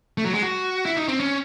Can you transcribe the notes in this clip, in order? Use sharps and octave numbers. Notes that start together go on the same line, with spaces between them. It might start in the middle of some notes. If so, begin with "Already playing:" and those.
A3
F#3
G#3
F#4
E4
D#4
C4
C#4